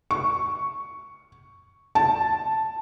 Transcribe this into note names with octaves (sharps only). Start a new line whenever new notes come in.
C#6
A5